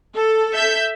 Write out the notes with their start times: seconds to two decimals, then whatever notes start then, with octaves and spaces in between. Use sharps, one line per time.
0.14 A4
0.52 E5 G6